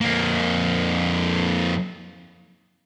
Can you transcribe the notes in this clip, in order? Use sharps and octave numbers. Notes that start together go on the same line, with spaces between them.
F2 A#3